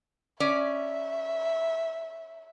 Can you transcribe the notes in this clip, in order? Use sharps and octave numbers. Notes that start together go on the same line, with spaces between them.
C#4 D5 E5